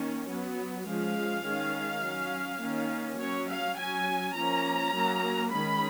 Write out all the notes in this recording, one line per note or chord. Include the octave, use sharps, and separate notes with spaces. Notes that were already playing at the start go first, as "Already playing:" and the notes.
Already playing: D#3 A#3 C#4
F#3 B3
F3 G#3 C#4 F5
D#3 G#3 C#4
F#3 C#4
D#3 A#3 C#4
F#3 C#4 C#5
F5
F#3 C#4 G#5
F3 A#3 C#4 A#5
F#3 A#3 C#4
D#3 G#3 C#4 B5